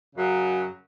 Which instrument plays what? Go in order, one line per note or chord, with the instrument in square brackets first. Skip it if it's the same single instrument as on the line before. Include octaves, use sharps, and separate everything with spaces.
[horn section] F#2 C#3 F#3